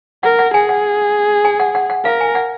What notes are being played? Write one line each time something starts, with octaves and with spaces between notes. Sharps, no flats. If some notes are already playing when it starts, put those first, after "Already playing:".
A#4 F#5
F#5
G#4 G#5
F#5
G#5
F#5
F#5
F#5
A#4 F5
G#5
F#5